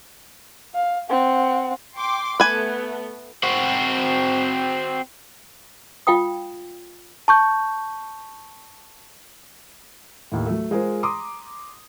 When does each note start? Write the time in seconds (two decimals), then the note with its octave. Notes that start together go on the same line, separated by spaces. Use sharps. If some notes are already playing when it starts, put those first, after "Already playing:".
0.74 F5
1.09 C4 F#5
1.97 G5 C6 D6
2.40 A3 B3 B4 G#5
3.43 C4 F#4
6.07 F4 F5 G5 D#6
7.28 A5 C#6 G6
10.32 D#2 A2
10.46 F#3 A3
10.71 G#3 F4 G#4 A#4 C5
11.03 A#5 C6 D6 D#6